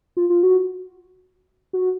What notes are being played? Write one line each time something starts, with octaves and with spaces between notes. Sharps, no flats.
F4
F4
F#4
F#4